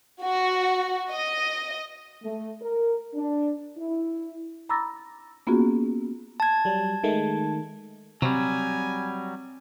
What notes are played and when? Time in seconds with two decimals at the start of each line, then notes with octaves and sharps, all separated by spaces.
0.22 F#4
1.11 D#5
2.23 A3
2.61 A#4
3.15 D4
3.78 E4
4.69 A#5 B5 D6 E6 A6 A#6
5.47 A#3 B3 C#4 F4 F#4 G#4
6.40 A5 G#6
6.65 F#3 G3
7.04 D#3 G#3 A3
8.22 C3 F#3 G3 C4 G#5